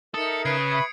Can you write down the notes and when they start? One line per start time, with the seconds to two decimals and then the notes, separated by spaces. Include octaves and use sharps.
0.14 D#4 A4 A#4 E5 D#6 C#7
0.45 C#3 B4 G#6 C7 D7
0.71 E5 B5 C#6 G#6